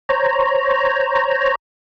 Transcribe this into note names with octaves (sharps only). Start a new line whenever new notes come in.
C5 C#5 A#5